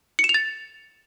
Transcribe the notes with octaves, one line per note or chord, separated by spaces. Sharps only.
C#7
E7
F7
A6